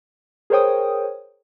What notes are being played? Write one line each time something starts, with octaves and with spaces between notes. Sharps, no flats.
G#4 A#4 C5 C#5 G5 D#6